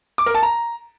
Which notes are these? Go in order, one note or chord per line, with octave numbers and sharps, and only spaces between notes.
D6
A#4
A5
A#5